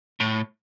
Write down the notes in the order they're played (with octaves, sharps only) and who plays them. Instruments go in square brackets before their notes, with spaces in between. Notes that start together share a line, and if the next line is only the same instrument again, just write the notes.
[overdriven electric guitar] A2